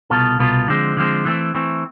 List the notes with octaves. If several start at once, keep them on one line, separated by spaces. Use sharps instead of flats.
C2 B2 B3 F4 A4
C2 B2 B3 F4 A4
D3 F3 G#3 C4
D3 F3 G#3 C4
E3 A3 C4
E3 A3 C4